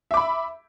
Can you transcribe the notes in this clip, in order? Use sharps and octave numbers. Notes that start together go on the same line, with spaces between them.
E5 B5 D6